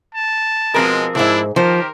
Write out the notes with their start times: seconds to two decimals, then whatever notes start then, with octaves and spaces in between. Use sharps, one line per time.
0.15 A5
0.74 B2 F3 G#3 C4 A#4
1.15 D2 G#2 D4 E4
1.56 D#3 F3 G4 A#4 C5